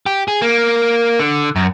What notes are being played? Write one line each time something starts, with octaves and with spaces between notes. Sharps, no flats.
G4
G#4
A#3
D3
F#2